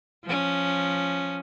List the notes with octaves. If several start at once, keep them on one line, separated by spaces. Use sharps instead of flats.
F3 C#4